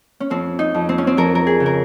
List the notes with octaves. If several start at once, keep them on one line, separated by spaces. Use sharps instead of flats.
C#4
F2 C4
D#4
F2
C4
C#4
C4
F2 A#4
A#4
G#4
C#3
A#4